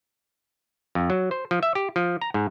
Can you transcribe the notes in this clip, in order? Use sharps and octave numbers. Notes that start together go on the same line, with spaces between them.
F2
F#3
C5
F3
E5
G4
F3
A#5
G#2